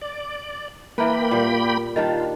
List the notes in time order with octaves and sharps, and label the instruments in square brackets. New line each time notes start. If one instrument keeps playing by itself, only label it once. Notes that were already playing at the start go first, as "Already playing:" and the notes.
[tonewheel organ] D5
[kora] E3 A#4 B4 [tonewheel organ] A#3 G5 B5
[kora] A#2 G3
[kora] D#3 G3 D4 [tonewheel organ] F4